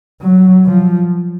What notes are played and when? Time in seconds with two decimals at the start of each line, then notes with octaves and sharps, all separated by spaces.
0.21 F#3
0.65 F3